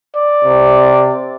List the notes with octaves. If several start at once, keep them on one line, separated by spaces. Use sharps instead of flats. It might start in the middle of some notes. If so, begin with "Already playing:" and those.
D5
C3